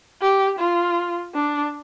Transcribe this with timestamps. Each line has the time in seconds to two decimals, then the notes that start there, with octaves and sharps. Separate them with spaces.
0.21 G4
0.59 F4
1.34 D4